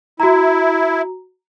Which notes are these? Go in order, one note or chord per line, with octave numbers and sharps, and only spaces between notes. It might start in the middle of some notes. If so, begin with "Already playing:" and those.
E4 F#4 A#5